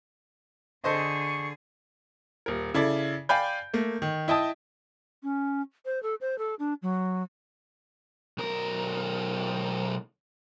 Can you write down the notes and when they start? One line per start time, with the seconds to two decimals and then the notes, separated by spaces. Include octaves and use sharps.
0.84 D3 G#4 A4 C5 D#5 C#6
2.46 D#1 A#4
2.74 C#3 E4 A4 D5
3.29 D5 F5 G5 G#5 B5 G6
3.74 A3 A#3
4.02 D#3
4.28 E4 D#5 G5 A5 D#6
5.23 C#4
5.85 C5
6.03 A4
6.21 C5
6.38 A4
6.59 D4
6.82 F#3
8.38 B1 A#4